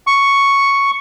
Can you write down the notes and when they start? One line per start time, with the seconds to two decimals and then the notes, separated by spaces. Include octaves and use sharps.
0.07 C#6